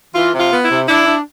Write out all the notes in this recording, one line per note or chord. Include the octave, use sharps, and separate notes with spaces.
E3 F4
C3
F4
B3
E4
C3
D4 E4
D4